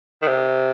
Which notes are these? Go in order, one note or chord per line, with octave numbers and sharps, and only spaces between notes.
D#3
C3